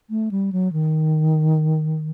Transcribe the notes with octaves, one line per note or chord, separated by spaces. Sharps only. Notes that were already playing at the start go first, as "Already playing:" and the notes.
A3
G3
F#3
D#3